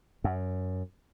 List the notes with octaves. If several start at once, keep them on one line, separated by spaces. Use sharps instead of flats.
F#2